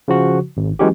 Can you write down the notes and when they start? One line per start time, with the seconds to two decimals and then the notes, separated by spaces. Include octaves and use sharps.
0.08 C#3 F3 F#4
0.57 G#1
0.79 E3 F#3 G#3 C#4 F#4 G4